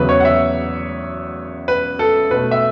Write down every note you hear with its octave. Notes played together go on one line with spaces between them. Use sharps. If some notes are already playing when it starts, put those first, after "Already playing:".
Already playing: E2 C#3 F#3 B3 B4 E5
C#5
F#5
E5
B4
A4
B2 A3 B4
E5